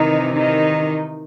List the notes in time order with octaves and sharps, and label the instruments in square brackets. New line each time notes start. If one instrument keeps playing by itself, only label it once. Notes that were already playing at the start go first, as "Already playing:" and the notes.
Already playing: [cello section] C3 D#3 E3 D#4
D#3 D#4